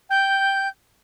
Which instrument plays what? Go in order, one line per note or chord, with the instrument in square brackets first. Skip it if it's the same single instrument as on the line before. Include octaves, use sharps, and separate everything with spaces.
[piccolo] G5 [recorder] G6